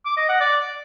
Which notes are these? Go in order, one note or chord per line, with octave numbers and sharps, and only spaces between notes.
D6
D#5
F#5
D5